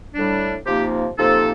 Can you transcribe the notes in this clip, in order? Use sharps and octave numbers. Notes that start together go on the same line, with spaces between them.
A2 G3 D4
C3 F3 A#3 D#4 G4
C3 F3 A#3 D#4 A4